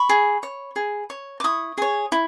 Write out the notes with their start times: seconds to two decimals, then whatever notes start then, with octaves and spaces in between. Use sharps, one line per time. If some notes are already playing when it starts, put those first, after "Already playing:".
Already playing: B5 C#6
0.09 G#4
0.43 C#5
0.76 G#4
1.10 C#5
1.40 D6
1.44 E4 C#6 D#6
1.78 G#4 C#5
2.12 E4